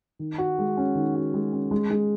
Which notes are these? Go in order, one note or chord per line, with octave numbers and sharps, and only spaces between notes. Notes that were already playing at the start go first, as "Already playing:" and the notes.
D#3
F#4
G#3
C#4
D#3
F#4
G#3
C#4
G#3
G#3